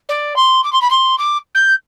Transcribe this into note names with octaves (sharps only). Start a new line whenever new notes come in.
D5
C6
D6
C6
B5
C6
D6
G6